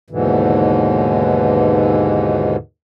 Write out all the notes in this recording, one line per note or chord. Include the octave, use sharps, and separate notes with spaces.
D#2 G#2 B2 D3 E3